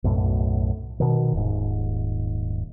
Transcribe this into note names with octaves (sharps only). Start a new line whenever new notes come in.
B1 F#2 A2
B2 D#3
D#1 G#2